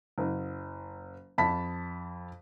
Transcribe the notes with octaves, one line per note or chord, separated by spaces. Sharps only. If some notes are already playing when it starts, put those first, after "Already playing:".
F#1
F2 A5 B5 B6